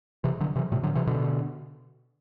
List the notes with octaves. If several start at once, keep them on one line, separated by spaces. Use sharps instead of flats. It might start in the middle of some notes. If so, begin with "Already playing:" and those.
C3 E3
D3 F#3
C3 E3
A2 C3
D3 F#3
C3 E3
B2 D3